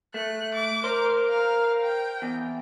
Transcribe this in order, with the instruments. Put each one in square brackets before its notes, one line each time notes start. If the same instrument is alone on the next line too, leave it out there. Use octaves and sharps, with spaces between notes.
[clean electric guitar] A3 [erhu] F#6
[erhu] D6
[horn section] A#4 [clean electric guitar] C5
[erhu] F5
G5
[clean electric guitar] E2